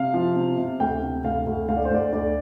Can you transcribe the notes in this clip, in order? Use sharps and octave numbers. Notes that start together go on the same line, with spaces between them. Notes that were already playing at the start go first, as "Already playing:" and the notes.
Already playing: C3 F5
F3
C3
C3
D2 G5
C3
D2 F5
D2
D2 F5
D5
C5
D2 D5
D2 D5